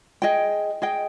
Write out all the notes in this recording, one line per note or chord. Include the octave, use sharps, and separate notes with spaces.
G#4 D#5 G5
G#4 D#5 G5